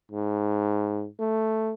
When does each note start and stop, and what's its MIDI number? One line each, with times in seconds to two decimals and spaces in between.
0.11 1.06 44
1.19 1.74 57